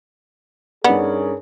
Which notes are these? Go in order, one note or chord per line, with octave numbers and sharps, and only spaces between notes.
G2 B3 C#4 D#4 G#4 A#4 D5